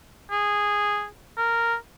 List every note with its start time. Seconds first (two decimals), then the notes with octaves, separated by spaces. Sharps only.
0.31 G#4
1.37 A#4